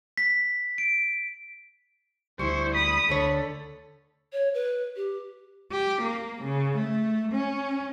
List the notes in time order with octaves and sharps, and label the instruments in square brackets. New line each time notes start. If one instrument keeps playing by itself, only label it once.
[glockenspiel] B6
D7
[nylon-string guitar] D2 G3 [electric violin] E4 C5 [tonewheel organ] C#6
[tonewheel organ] B5 [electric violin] D#6
[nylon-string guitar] D2 D3 C#5 [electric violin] A4
[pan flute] C#5
B4
G4
[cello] G4
A#3
C#3
A3
C#4